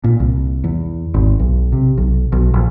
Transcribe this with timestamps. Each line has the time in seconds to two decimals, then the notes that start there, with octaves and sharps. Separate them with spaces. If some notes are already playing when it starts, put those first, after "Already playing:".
0.04 A#2
0.20 C2
0.64 E2
1.14 G#1
1.39 B1
1.72 C3
1.98 B1
2.32 B1
2.54 A#1